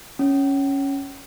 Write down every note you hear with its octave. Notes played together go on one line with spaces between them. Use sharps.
C#4